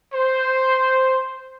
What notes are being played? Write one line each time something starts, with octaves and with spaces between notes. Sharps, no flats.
C5